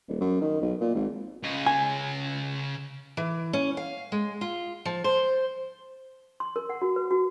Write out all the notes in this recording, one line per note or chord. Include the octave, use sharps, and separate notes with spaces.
D#1
F#2
D#3
B1
A#2
G#1
C#3 D#5
G#5
E3
C#4
F5
G#3
F4
F3
C5
C6
A#4
F#5
F#4
B4
F#4